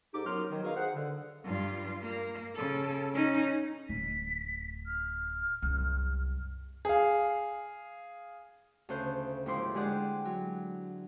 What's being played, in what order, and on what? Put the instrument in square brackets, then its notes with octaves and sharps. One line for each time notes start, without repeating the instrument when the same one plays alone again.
[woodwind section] G#2 D#4 G4 A4 D6
F#2 F#3 B3 D#4 C6 F6
D#3 F#3
D#4 F#4 G#4 A#4 B4 F5
G#4 C5 F5 F#5
D3
[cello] G2 F4
A#3
C#3 A4
C#4 D#4
[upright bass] D1 [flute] B6
[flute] F6
[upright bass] C2 F#2
[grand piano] G#4 F5
[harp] D2 C#3 A4 C5 F#6 G6
D#2 G#2 F3 E4 C6 D6
D3 G#3 G4 G#4 D5 F#5
F#3